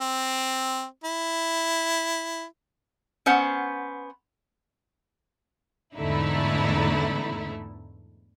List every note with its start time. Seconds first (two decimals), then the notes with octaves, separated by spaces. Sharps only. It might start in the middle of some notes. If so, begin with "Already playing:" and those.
0.01 C4
1.04 E4
3.26 B3 C#4 C5 F#5
5.97 E2 G#2 D3 A3 D#4 E4